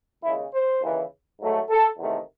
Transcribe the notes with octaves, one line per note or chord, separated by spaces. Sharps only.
D#2 C#3 G#3 E4
C5
D#2 C#3 E3
G#2 F#3 A3
A4
E2 C3 D#3 A3